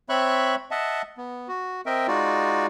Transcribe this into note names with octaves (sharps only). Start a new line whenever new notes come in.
C4 C#5 E5 B5 C#6 F#6
D#5 E5 F#5 A5
B3
F#4
C4 A#4 D#5 E5 G5
G#3 D#4 F4 F#4 D5